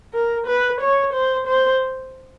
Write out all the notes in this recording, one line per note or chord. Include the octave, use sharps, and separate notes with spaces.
A#4
B4
C#5
C5
C5